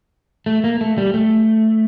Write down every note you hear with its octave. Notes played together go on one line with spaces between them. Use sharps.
A3
A#3
A3
G3
A3